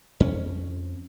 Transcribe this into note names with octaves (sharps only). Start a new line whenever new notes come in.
F2 C#4